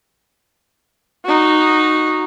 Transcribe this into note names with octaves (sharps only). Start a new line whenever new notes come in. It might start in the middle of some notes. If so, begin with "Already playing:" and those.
D#4 F#4